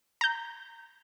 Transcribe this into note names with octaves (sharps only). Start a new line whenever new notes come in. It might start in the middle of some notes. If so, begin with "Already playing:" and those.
A#5 G6